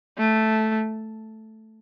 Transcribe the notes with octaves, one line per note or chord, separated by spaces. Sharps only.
A3